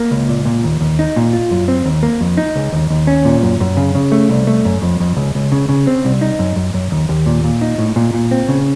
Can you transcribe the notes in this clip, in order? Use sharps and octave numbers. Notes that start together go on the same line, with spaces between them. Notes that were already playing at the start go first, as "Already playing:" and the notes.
Already playing: A#3
C#2
A#2
A#2
D#2
D#2
D#4
A#2
F4
F#2
C4
D#2
A#3
F2
D#4
C#2
D#2
D#2
C#4
A#2
F#2
F#2
C#3
C#3
A3
C2
A3
F#2
F2
F2
C#2
C#2
C#3
C#3
C4
C2
D#4
F#2
F#2
F#2
D#2
D#2
A#2
A#2
D#4
A2
A#2
A#2
C4
C#3